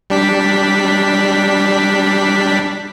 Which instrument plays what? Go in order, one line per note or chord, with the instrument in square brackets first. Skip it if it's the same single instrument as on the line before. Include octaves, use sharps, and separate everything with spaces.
[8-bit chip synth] G3 D4 B6